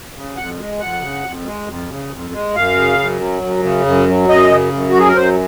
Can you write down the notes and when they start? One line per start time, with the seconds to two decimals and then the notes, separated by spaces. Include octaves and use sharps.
0.15 C#3
0.37 F2 F#5
0.58 G#3
0.80 F2 F#5
1.01 C#3
1.24 F2
1.46 G#3
1.67 F2
1.89 C#3
2.11 F2
2.33 G#3
2.54 F#2 F5
2.76 C#3
2.99 F#2
3.20 F#3
3.42 F#2
3.63 C#3
3.86 F#2
4.08 F#3
4.29 F#2 D#5
4.51 C#3
4.73 F#2
4.89 F#4
4.94 F#3 G#4
5.08 A#4
5.16 F#2 C5